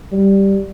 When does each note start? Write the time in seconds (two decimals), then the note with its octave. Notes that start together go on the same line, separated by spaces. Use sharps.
0.12 G3